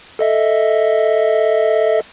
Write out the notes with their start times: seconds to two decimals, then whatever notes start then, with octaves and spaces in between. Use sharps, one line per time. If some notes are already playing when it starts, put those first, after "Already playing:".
0.19 A4 D#5 E5